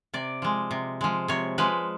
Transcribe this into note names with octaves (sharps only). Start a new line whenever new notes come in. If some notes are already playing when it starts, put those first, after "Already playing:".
C3 D5
F3 G#3
C3
F3 G#3
C3 C#5
F3 G#3 B4